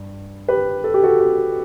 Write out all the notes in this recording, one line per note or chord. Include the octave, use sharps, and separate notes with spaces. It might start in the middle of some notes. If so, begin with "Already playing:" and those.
Already playing: G2
G4 B4
A4
G4
F#4 A4
G4